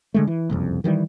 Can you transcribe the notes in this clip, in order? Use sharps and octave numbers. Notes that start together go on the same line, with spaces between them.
D3 G#3 A3
E3
F#1 C2 F2
D#3 E3 F#3 G3